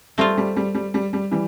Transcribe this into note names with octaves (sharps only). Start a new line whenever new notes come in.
G3 A3 C4 F4
G3
G3
G3
G3
G3
E3 G3